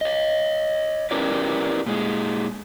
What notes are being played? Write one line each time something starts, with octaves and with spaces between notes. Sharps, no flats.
C#5 D#5
C#4 E4 G4 A#4 B4 D5
A#2 G#3